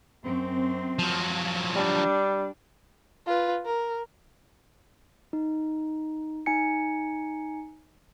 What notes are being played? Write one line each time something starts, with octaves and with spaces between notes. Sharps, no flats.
F#2 C4
F3 F#3
G3 D4
F4 B4
A#4
D#4
D#4 G#5 C#7